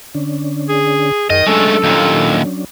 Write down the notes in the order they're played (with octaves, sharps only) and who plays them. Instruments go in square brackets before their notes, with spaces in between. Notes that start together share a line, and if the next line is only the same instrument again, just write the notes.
[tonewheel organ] D3 C#4 D4
[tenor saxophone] G#4
[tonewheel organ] F#2 G#4 [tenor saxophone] D#3 [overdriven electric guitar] D#5
[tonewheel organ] F#3 C#4 D4 [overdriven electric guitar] G#3 A3 [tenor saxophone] A4
[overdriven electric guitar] D#2 A#2